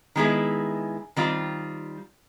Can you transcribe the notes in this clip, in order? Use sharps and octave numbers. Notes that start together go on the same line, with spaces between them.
D#3 G#3 B3 E4 G#4
D#3 G3 C4 F4